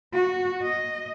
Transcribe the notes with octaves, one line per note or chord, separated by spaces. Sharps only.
F#4
D#5